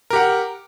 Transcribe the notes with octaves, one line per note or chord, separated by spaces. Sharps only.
G4 A#4 F#5